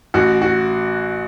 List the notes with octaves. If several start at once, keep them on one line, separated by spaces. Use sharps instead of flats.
A1 F#4
F#4